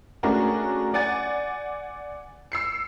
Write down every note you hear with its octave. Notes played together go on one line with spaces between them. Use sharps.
A3 C#4 D4 F#4 G#4 A#4
D5 F#5 G#5 A6
E6 C7 C#7